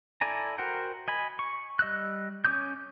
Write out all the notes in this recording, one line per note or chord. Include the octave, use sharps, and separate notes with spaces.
E4 A4 D5 G#5 A#5
F#4 A#4 C5 F#5 G5
D#5 G#5 B5
C#6
G3 D#5 E6 F#6
C#4 C#5 D6 D#6 G6